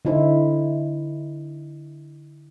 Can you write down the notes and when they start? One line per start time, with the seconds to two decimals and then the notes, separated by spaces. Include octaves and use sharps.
0.05 D3 D#4 E4 C5